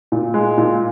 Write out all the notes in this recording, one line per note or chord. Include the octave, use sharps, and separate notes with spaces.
A#2
G#3
A#2